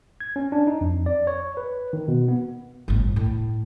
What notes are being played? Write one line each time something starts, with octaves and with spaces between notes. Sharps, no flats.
G#6
C#4
D4
D#4
F2
D5
C#5
B4
D#3
B2
B3
G1 A2
A2